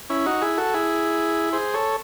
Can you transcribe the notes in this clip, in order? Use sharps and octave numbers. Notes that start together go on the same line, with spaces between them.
C#4 E4
D#4 F#4
E4 G#4
F#4 A4
E4 G#4
G#4 C5
A4 C#5